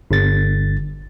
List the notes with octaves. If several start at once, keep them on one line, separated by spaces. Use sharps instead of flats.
G1 A6